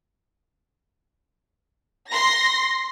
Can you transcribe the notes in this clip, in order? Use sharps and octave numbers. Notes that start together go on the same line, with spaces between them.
C6 A#6